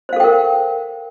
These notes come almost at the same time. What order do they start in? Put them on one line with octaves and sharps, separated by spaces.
C5 F5 A4 G5 A#4